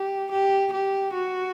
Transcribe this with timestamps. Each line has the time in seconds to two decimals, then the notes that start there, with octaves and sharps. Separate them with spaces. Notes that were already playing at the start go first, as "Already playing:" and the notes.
Already playing: G4
0.31 G4
0.73 G4
1.14 F#4